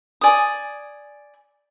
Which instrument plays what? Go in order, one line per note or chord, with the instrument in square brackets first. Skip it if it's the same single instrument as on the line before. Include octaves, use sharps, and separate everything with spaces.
[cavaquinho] D5 G#5 D#6